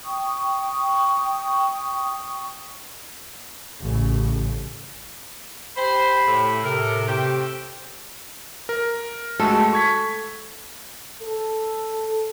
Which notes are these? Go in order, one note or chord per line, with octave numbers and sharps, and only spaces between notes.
G5 C#6 D#6
A1 C#3
G4 C5 G5 B5
A2
A2 C3 A4 A#4
A3 C4 G4
A#4
G#3 A3 F#4 A4
C#6 G#6 B6
A4